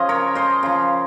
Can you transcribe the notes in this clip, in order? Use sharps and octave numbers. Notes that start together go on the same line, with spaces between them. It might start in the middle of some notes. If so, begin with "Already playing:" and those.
Already playing: C#3 F3 D#5
A#4 C#5
C5 D#5
C#3 F3